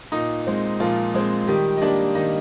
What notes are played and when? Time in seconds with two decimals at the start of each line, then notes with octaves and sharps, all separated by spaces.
0.12 A#2 D#4
0.47 G#3 C4
0.80 A#2 F3 F4
1.14 G#3 C4
1.47 D#3 G3 G4
1.77 D#5
1.82 G3 A#3 D4 D5
2.15 D#3 D#4 D#5